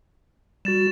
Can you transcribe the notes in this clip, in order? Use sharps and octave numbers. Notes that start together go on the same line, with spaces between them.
G3 F#4 A6 E7